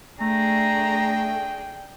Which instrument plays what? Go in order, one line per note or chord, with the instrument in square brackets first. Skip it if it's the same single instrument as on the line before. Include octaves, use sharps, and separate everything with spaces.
[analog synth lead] A3 [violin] D4 G#4 [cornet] G5 [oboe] A#5